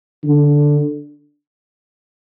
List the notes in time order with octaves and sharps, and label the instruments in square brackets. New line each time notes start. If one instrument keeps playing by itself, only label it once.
[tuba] D3